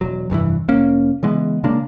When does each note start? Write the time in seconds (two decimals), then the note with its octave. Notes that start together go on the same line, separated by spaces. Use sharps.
0.01 E1 F#3
0.30 F1 G2 C3 E3
0.68 F1 A#3 C#4
1.23 C#3 E3 G#3 B3
1.64 C#3 G#3 A#3 D4